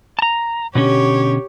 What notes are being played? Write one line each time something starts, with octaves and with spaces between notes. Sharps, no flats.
A5 A#5
B2 D3 C#4 G4 C#5